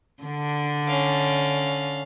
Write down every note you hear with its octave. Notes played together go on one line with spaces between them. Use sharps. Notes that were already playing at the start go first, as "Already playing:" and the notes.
D3 D4
C#4 F5